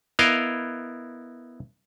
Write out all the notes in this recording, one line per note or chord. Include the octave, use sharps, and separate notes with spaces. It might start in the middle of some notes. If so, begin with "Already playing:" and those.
B3 E4 A#4 D#5 F5